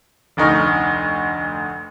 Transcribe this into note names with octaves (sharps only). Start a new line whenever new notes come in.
F1 D2 D#4 C#6 F6